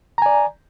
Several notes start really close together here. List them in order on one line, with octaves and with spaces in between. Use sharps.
A#5 G#5 D5